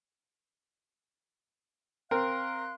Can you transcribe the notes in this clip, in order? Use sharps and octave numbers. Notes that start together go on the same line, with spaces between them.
C4 A#4 F5 C6 F#6